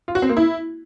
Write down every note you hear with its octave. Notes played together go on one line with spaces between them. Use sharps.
F4
F#4
C4
A#3
E4